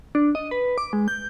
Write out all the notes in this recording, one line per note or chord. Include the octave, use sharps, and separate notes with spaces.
D4
D#5
B4
D6
G#3
G6